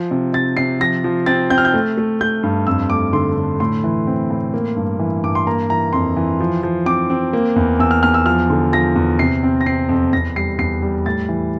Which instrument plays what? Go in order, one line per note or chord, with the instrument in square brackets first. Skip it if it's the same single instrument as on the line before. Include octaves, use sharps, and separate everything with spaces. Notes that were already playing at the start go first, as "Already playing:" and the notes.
Already playing: [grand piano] F3
C3
C3 A6
C3 C7
F3 A#6
F3
C4 A6
C4 G6
F6
G6
A3
A3
A3 G6
G2
F2 E6
A3 D6
D3 C6
D3
A2 C6
E3
C4
A2
A#3
G2
E3
G2 D6
C6
A#3 A#5
E3 A#5
F2 C6
E3
F3
F3
C4 D6
C4
A#3
E2
E2 E6
F6
E2 F6
E6
F3 F6
D3
F3 A#6
E2
C3 C7
C4
A#6
C4 C7
F2
E2 A#6
G3 C7
E2 C7
G3
A2 A6
E3